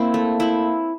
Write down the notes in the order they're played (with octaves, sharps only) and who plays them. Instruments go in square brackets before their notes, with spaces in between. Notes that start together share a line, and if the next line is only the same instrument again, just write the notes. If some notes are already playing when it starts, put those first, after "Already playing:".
Already playing: [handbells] A#3 [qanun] C4 E4
[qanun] A3
C4 E4